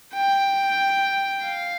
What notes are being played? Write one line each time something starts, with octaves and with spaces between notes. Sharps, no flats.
G5
F5